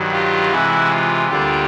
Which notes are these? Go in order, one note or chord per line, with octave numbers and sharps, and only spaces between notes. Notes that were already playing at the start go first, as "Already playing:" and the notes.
Already playing: G2 D#3 F#3
F4 G4
C3 E3 G#3 E4 F#4
F4
D2 D3 G3 A#3 D4 F4 G4